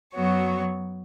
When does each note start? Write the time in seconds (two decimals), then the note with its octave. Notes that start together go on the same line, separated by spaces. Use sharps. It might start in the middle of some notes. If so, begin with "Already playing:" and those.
0.14 F#2 F#3 B3 F#4 C#5